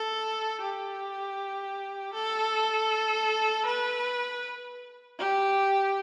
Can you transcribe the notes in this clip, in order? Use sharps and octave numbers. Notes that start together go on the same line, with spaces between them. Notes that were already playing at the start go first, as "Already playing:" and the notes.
Already playing: A4
G4
A4
B4
G4